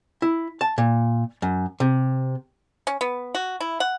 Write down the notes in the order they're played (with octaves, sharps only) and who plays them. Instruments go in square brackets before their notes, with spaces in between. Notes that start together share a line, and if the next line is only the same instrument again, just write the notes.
[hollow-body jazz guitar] E4
A5
A#2
F#2
C3
[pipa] C#4
B3
F#4
E4
F#5